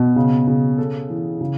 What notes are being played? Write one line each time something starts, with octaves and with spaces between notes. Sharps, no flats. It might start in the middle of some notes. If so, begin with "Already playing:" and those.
Already playing: B2
C#3
C#3
A4
E3
C#3